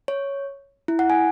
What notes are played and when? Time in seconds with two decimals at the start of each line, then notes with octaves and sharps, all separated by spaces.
0.08 C#5
0.88 E4
0.99 F#5
1.10 G#5